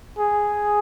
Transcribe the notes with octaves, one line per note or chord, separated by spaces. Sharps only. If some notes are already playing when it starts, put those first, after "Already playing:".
G#4